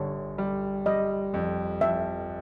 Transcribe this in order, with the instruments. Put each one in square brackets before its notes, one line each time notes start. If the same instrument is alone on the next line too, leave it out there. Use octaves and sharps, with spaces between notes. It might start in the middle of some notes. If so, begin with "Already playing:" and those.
Already playing: [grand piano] G1 D3 G3 [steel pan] C#5
[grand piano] G3
[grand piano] G3 [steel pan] D#5
[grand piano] F2
[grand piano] F2 [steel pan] E5